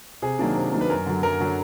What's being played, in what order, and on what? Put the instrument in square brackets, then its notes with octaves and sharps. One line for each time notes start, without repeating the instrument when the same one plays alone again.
[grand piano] C3 G#4
D#3 F#3 A#3 D4
C3
D#3 F#3 A#3 D4
B4
F#2 A#4
D3 F#3
F#2 A#4
D3 F#3